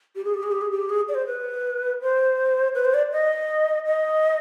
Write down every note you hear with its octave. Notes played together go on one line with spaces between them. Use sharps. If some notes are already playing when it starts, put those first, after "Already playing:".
G4
G#4
G4
G#4
G4
G#4
G4
G#4
D5
C5
B4
C5
B4
C5
D5
D#5
D#5